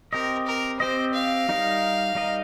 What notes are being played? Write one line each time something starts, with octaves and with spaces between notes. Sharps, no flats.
C4 G4 A#4 D#5
A#4
C4 G4 C5 D#5
F5
G3 D#4 A#4 D#5
G3 D#4 A#4 D#5